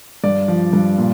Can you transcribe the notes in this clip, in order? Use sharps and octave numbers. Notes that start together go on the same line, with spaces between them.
G2 D5
F3
G2
A#2